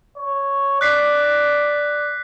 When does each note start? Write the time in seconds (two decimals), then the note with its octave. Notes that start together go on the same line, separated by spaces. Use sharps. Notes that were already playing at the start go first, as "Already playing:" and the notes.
0.17 C#5
0.81 D5 F#6 B6 C7
1.25 A#6